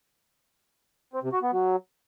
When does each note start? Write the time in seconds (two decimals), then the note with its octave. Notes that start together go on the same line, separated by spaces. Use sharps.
1.13 C4
1.23 C3
1.33 F#4
1.42 B3
1.52 F#3